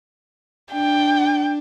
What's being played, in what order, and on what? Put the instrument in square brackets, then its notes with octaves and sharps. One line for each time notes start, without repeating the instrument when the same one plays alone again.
[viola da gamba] D4 [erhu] G5